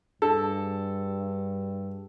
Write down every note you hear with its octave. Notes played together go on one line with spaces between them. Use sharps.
G2 D4 G#4 A4